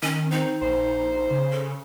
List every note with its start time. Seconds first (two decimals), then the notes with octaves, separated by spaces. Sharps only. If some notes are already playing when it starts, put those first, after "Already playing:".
0.03 D#3 C#4
0.31 C4 D#4
0.62 A#1 C5
1.31 C#3
1.52 A4